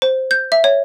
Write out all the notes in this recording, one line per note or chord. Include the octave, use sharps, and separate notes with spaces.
C5
G6
E5
C#5